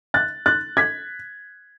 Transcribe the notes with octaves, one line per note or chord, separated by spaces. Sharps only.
F#6 A6
F#6 A6
G#6 B6